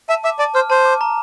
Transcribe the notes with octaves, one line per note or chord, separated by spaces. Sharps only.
E5 A5
E5 D6
D5 A5
C5 F6
C5 A5
D6
A#5